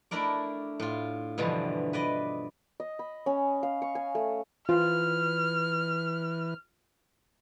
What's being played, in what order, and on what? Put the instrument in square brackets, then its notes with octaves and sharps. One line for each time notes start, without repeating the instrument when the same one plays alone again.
[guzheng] A3 D4 E4 A#4 D5
A2 F4
G2 B2 D3 E3 F3
B4 D5 D#5
[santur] D#5
B5
C#4
F5
C#6
G#5
A3
[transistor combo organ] E3 B4 [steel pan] F4 [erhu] F6